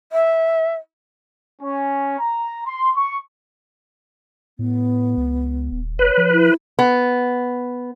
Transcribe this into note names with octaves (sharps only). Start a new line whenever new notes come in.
E5
C#4
A#5
C6
C#6
A2 B3
C#2
D#1
F1 B4 C#5
F3
E4
B3